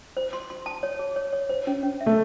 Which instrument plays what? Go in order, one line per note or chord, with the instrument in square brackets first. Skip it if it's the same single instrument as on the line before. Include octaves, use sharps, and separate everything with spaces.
[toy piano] C5
C6
C6
A5
C#5
G#4
C#5
C#5
C5
C#4
C#4
E5
[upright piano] A3